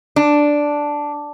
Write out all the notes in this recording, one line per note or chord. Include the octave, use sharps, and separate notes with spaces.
D4